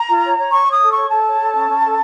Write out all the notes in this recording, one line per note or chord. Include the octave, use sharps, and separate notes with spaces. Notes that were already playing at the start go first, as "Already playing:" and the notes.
Already playing: A#5
F4
C#5
C#5
C#5 C#6
C#5 D#6
A4
C#5 C#6
A4 A5
C#5
A4
C#4
C#4
A4